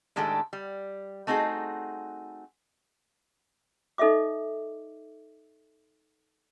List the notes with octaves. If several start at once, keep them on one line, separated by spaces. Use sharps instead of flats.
A2 D#3 G#3 D4 G4 A4
G3
A3 C4 D#4 F#4 G#4
D#4 A4 D#5 E5 D6